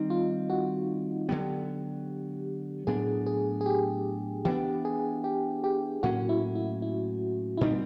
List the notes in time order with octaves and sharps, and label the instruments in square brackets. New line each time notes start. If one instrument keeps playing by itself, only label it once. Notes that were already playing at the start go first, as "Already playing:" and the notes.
Already playing: [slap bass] D#3 G3 C4 [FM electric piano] D#4
[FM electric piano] F4
F#4
[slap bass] D3 F#3 B3 [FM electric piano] G4
[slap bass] A2 F#3 B3 D4 [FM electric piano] G#4
[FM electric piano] G#4
G#4
G4
[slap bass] E3 G3 B3 D4 [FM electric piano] G4
[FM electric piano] G#4
G4
G4
[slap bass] A2 F#3 A#3 C#4 [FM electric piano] F#4
[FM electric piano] E4
E4
E4
E4
[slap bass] A#2 G3 C4 [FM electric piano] D#4